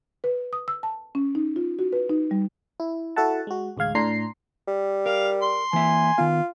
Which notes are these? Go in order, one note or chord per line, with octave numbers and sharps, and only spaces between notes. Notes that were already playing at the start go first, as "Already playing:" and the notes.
B4
D#6
E6
A5
C#4
D#4
F4
F#4
B4
D#4
G3
E4
E4 F#4 A4 E5 F#5 A5
G#3 F#4
A1 D2 G#3 F5 G#6
A2 D4 A#5 C6 C7
G3
A#4 F5
C6
E3 A#3 E5 G#5
D#3 B3 F4